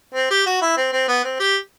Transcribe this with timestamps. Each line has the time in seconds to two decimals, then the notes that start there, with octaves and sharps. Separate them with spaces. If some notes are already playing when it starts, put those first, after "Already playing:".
0.14 C4
0.30 G4
0.46 F#4
0.61 E4
0.77 C4
0.93 C4
1.08 B3
1.24 C4
1.40 G4